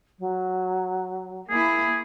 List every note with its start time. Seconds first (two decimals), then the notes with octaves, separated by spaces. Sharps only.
0.19 F#3
1.50 A#3 E4 G#4